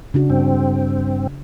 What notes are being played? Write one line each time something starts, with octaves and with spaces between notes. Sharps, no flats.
C#3 D4 F#4
G2 C4